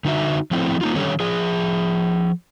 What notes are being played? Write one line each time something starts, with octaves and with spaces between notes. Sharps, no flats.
D3 D#4 F#4 E5
F3 A3 C4 E4
A#3 D#4 F4
D3 D#3 G3 C#4 A4 C#5
F3 G#4